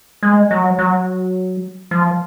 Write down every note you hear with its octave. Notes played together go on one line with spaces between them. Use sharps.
G#3
F#3
F#3
F3